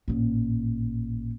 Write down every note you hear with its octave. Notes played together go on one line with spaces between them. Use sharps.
A1 A#2